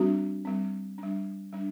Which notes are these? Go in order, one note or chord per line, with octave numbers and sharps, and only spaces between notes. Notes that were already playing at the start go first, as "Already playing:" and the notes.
Already playing: G3 C4 D4 F#4
G3 C4
G3 D4
G3 D4